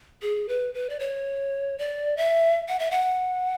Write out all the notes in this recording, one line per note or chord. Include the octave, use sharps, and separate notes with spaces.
G#4
B4
B4
D5
C#5
D5
E5
F#5
E5
F#5